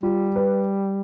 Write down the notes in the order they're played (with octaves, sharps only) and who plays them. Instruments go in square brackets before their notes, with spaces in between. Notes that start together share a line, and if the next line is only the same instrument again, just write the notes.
[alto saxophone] G3 [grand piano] F4
[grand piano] B4